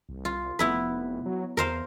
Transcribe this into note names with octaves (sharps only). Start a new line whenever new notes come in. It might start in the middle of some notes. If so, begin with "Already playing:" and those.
C2
F4
F1 B3 E4 B4
F#3
E2 A#4 C5 F5